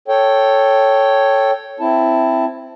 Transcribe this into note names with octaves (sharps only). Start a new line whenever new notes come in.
A4 C#5 G5
C4 E4 A5